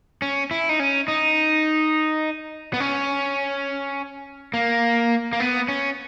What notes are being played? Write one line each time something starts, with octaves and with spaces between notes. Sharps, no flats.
C#4
E4
D#4
C#4
D#4
B3
C#4
A#3
A#3
B3
C#4